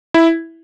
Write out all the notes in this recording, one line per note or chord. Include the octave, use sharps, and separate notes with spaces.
E4